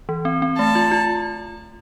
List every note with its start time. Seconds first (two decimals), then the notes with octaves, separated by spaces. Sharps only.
0.09 E3
0.25 C4
0.42 C4
0.58 A3 A5
0.75 F4
0.91 F4